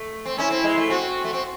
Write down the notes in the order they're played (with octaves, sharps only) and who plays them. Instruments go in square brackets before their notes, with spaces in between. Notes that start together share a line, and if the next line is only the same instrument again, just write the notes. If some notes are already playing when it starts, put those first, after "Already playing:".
Already playing: [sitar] A3
C4
[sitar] C#4 [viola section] E4
[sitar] C4
G#3
A3
[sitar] C4 [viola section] F#4
[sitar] A3
C4